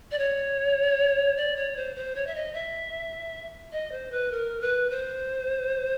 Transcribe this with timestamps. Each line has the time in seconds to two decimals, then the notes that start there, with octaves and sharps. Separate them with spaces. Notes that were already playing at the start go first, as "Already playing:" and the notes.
0.11 D5
0.19 C#5
1.37 D5
1.56 C#5
1.76 C5
1.96 C5
2.16 C#5
2.27 E5
2.35 D#5
2.54 E5
3.72 D#5
3.92 C5
4.11 B4
4.31 A#4
4.61 B4
4.90 C5